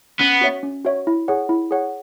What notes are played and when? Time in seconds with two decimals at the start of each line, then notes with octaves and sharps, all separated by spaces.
0.20 B3 C#4
0.41 F#4 C#5 E5
0.63 C#4
0.85 F#4 C#5 E5
1.07 E4
1.28 G#4 C#5 F#5
1.49 E4
1.71 G#4 C#5 F#5